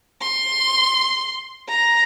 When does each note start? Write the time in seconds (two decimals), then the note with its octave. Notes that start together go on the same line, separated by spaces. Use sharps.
0.21 C6
1.68 A#5